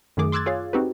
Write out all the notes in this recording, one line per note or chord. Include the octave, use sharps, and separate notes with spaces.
F#2 D#3 A3 G#4 D6
C6 D6 E6 F#6 G#6 A6
F4 G#4 C#5 F5
C4 D#4 F#4 G4 B4